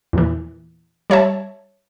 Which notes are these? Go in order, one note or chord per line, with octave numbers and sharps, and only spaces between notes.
E2 A#2 E3
G3 C#5 E5 A5